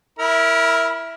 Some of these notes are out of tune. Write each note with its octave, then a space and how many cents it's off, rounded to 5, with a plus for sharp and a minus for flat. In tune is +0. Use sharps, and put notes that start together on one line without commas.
E4 +0 A#4 +0 B5 -30